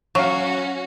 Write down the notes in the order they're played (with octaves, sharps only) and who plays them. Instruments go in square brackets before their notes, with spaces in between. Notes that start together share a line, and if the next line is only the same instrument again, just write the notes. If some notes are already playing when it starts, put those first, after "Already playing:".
[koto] F#3 [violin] C#4 F#4 [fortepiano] F5 C#6